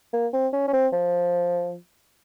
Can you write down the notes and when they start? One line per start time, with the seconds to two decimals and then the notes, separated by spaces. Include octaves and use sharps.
0.13 A#3
0.33 C4
0.53 C#4
0.68 C#4
0.73 C4
0.92 F3